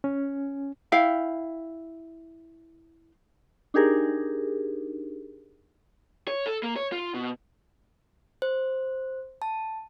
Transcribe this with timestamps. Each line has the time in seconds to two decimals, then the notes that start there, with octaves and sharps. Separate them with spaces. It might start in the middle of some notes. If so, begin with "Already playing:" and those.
0.04 C#4
0.92 E4 F5 G5
3.74 D4 D#4 G4 G#4 A#4
6.28 C#5
6.46 A4
6.63 A#3
6.76 C#5
6.92 F4
7.14 B2
8.42 C5
9.42 A5